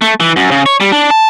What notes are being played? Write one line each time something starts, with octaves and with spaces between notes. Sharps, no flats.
A3
E3
F#2
C#3
C#5
G3
D4
A5